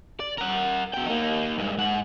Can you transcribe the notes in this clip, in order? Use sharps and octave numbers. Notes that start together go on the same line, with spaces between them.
D5
A#4 F#5
B2 G5
A#3 D#4
G2 G#3
G#2 F#5